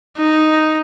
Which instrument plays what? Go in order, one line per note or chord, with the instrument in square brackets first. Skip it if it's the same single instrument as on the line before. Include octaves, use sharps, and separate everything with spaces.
[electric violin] D#4